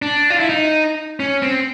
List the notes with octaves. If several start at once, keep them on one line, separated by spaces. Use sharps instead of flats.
D4
F4
E4
D#4
C#4
C4